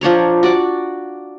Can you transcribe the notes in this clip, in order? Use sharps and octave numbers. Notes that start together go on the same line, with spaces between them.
F3 D4 C#5 A#5
F#4 D5 D6